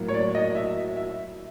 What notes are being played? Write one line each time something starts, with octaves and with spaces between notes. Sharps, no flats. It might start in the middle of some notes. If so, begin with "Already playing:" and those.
Already playing: A2 F#3 A#3
C#5
D5
D#5
E5
E5